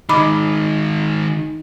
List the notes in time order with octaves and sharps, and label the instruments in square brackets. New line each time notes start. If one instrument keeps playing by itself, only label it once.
[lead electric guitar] D#3 G#3 [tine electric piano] D#4 D#5 [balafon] B5 D6